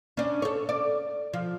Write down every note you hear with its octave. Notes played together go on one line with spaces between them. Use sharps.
C#4 D4
A4 C#5
D5
F3